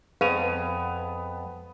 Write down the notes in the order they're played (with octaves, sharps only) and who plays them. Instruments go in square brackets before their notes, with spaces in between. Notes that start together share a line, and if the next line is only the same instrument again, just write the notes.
[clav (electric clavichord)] F2 G#5 A#5 [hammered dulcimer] B3 [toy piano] G#4 B4 F5